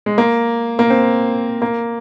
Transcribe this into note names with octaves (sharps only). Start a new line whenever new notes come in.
G#3
A#3
A#3
C4
A#3